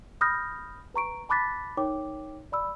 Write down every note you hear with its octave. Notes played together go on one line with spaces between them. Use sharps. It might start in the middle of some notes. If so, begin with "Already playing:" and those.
B5 D#6 F6 G6 A#6
B4 A#5 C#6 D7
A5 B5 D6 F#6 A6 B6
D#4 A#4 C#5 G5 D6
D5 B5 E6